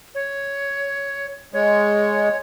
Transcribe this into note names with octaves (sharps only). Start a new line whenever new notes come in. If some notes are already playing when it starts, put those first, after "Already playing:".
C#5
G#3 C#5